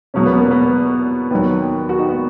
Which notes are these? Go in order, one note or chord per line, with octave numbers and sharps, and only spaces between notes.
E2 B2 F#3 C#4
B3
A#3
B3
D#2 D#3 F#3 B3
F#4
D#4
B3